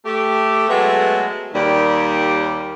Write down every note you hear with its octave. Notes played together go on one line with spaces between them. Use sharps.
A3 G4
F#3 G#3 A3 B3
D#2 G3